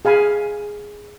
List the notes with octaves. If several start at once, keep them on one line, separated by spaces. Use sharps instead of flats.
G#4 F5 G#5 B5